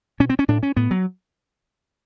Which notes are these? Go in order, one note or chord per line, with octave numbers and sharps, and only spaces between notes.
B2 C#4
C4
C#4
A2 D4
C#4
A2 B3
F#3